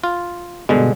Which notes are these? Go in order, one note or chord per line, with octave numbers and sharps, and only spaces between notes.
F4
G2 B2 D3 G#3